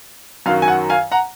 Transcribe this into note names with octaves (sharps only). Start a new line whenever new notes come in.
F#2 D#3 F#3 F5
G#5
F#5
F5 G#5
F#5 A#5